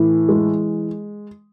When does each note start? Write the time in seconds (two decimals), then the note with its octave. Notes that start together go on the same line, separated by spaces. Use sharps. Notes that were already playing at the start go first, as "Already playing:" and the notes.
Already playing: A2 E3
0.29 G#3